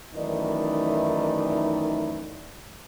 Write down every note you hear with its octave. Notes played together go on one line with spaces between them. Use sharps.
F#2 D#3 E3 A3 D#4 D5